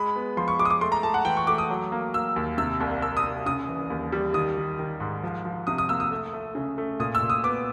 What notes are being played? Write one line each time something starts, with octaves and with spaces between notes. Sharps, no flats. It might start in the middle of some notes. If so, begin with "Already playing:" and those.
Already playing: G#3 B5
B3
F3 C6
C#6
G#3 D6
D#6
D6
A3 C6
A#5
A3 A5
F#5
E3 G5
C#6
A3 D6
D#6
F#3
A#3
A#3 E6
D#2
C3 E6
C2
C2 E6
D#6
C2
C#3 D#6
E3
D#2
G3
D#3 D#6
D#3
D#3
G#2
F3
F3
C3 D#6
D#6
A#3 E6
D#6
A3
A3
C#3
A3
A#2 D#6
E6
A#2
D#6
B3 D6